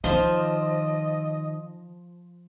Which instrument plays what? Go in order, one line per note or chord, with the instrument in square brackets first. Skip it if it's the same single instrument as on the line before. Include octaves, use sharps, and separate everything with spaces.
[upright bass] D#3 [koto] F3 C5 [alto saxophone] D#5